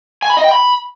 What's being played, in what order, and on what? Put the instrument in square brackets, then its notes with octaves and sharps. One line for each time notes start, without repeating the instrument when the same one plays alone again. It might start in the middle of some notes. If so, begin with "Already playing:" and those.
[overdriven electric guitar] G#5
B5
D#5
G5
B5